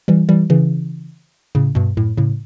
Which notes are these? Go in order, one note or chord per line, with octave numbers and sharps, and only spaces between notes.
E3 G3
E3 G3
C#3 E3
A2 C#3
G2 B2
F#2 A2
A2 C#3